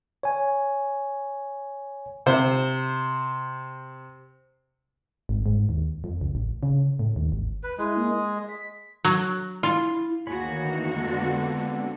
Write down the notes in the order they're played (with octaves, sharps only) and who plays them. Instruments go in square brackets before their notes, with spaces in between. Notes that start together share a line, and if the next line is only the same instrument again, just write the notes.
[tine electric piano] C#5 G#5
[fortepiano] C3 C5
[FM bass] G#1
G#2
D#2
F2
C#2
A1
C#3
A2
D#2
G#1
[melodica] B4
[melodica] G#3 [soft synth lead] E4
[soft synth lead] A#3
D#5
B6
[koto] F#3
[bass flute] E4 [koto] F4
[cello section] D2 A#3 F#4 [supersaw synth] D#3 [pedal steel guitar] G#4 C#5 B5
[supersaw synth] F2 D3 [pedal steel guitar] E3 D#4
[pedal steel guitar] G#3 B3